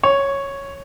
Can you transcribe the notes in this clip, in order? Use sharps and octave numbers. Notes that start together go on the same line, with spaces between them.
C#5